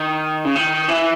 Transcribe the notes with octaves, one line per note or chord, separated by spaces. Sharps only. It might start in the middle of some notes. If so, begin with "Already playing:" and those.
Already playing: D#3
C#3
D#3
E3